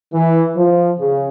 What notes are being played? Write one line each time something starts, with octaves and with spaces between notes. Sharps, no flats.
E3
F3
C#3